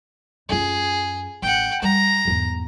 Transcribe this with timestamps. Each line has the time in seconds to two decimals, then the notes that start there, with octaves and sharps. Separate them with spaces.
0.49 F#2 F4 G#4
1.42 A1 F#5 G5
1.82 G3 A#5
2.25 E2 G#2